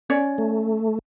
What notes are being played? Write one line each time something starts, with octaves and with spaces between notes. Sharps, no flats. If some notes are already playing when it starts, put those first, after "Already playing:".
C#4 C#5 D5
A3